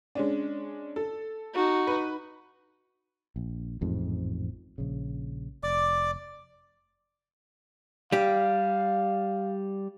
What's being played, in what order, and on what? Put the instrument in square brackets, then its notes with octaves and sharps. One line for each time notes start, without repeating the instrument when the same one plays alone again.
[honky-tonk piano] G#3 C#4 D4
A4
[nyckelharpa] D#4 F#4
[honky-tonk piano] B4
[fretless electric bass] A#1
A1 F2 G#2
A#1 C#3
[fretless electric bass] F1 [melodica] D5 D6
[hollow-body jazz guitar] G3 G4 [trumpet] F5